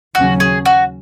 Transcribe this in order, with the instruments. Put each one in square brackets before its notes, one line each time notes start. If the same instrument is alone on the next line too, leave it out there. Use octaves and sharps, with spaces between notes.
[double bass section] D#2 C#3 F#3 C#4 [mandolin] F#4
[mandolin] G#4
F#4